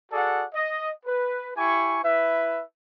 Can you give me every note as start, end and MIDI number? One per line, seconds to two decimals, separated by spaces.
0.12 0.44 66
0.12 0.44 68
0.12 0.44 69
0.12 0.44 74
0.12 0.44 78
0.54 0.91 75
1.06 1.50 71
1.57 2.00 64
1.57 2.00 67
1.57 2.00 80
1.57 2.00 85
2.04 2.62 64
2.04 2.62 71
2.04 2.62 76